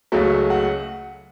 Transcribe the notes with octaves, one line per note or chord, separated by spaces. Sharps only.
C#2 C#3 F#3 A3
F#5